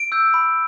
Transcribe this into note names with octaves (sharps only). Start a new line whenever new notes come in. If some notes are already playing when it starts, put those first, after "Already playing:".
Already playing: D7
E6 G6
B5